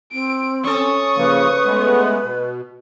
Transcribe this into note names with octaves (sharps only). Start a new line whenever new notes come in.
C4 D7
C#4 A4 C#6 D#6
C#3 F3 A#3 B4
G#3 A3 B3
B2